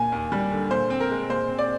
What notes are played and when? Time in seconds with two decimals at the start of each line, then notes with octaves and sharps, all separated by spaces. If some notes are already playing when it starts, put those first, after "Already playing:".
Already playing: A#2 G#5
0.12 D#2
0.32 G3
0.51 D3
0.71 A#2 C5
0.90 C4
1.00 A#4
1.10 G#3
1.29 A#2 C5
1.49 C4
1.59 D5